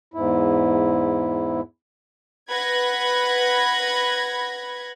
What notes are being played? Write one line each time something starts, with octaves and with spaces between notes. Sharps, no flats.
E2 G#2 E4
B4 F#5 B5 G#6 A#6